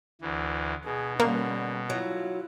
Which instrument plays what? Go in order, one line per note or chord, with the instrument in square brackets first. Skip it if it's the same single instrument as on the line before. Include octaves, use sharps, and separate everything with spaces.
[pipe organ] D2 E3
[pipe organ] B2 [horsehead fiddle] G#4
[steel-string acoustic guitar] D3 [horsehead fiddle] G3 C#4 [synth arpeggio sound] A#3
[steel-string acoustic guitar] F#3 [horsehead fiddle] E4 F4